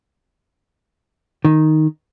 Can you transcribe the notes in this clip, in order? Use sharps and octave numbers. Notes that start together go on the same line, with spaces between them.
D#3